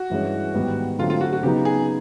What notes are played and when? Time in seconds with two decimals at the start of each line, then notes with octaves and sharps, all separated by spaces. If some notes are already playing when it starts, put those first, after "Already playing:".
Already playing: F#4
0.10 G2 E3 G#3 C#4
0.54 G#2 D#3 G3 B3
0.99 D3 F#3 A3 C4 F4
1.10 F4
1.21 F#4
1.33 F#4
1.43 C#3 F#3 B3 D#4 G4
1.65 G#4